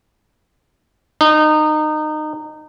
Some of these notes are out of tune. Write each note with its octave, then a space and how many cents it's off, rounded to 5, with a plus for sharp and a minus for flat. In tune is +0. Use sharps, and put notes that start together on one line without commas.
D#4 -25